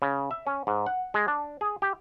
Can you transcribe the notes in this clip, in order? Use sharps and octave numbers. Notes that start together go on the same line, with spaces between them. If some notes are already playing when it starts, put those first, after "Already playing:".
C#3
E5
C#4
G#2
F#5
G#3
D4
G#4
G4